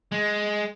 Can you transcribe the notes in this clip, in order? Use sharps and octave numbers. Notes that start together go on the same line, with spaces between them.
G#3